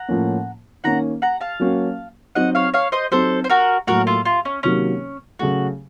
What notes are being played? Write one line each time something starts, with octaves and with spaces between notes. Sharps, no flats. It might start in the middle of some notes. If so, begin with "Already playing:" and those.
Already playing: F#5 A#5
A2 F3 A#3 C#4
D#3 A#3 C#4 F#5 A#5
F#5 A#5
F5 A5
F#3 A#3 C#4 F#4
F#3 C4 D#4 F#4 D#5 F#5
C#5 F5
C#5 F5
C5 D#5
F#3 C4 D#4 F#4 A4 C5
C5
F#4 A#4
A2 F#3 A#3 F#4 A#4
F4 A4
F4
C#4
C3 D#3 F#3 A#3 C#4
C#3 F#3 A3 F#4